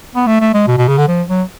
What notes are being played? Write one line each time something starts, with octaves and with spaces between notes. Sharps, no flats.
B3
A3
A3
G#3
B2
B2
C#3
D3
F3
F#3